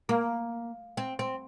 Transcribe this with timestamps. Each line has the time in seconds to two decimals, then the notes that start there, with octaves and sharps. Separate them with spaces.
0.09 A#3
0.97 C4
1.19 C4